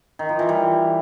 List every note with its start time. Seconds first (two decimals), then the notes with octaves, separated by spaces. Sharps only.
0.19 D#3
0.29 F3
0.39 E3
0.49 G3